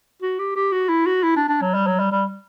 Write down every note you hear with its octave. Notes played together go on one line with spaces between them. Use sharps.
F#4
G4
G4
F#4
E4
F#4
E4
D4
D4
F#3
G3
F#3
G3
G3